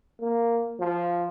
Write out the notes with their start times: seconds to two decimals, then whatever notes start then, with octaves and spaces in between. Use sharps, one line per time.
0.20 A#3
0.79 F3